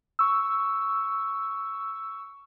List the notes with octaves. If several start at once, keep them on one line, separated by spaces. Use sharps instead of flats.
C#6 E6